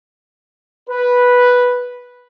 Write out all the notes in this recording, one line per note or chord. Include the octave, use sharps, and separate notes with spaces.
B4